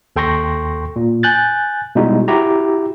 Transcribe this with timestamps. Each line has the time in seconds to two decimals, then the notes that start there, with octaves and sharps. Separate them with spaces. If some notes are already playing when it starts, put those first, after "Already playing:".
0.16 D#2 A4 G5 C6 C#6 A#6
0.96 A#2
1.23 G#5 F#6 G6 A6
1.95 B2 G3 G#3 D#4 E4 F#4
2.28 E4 F#4 G4 A#5